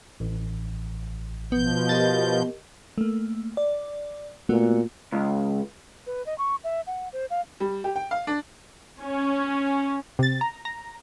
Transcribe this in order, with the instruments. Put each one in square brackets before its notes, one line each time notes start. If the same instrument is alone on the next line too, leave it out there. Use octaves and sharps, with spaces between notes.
[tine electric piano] A1
[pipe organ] B2 F3 G6 [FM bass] B3
[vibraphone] G4 A#4 D#5 [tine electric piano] A6
[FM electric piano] A3 A#3
D5
[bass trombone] A#2 [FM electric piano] A3 B3 F#4
[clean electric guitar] C#2
[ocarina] B4
D#5
C#6
E5
F#5
C5
F5
[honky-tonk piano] G3
G4
G5
F5
D4
[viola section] C#4
[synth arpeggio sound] C3 A6
A#5
A#5